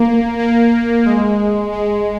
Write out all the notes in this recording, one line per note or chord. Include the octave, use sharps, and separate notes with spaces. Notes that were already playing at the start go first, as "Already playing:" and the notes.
Already playing: A#3
A#3
G#3
G#3